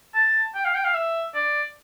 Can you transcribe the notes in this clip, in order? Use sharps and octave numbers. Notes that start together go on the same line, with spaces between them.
A5
G5
F5
G5
F5
E5
D5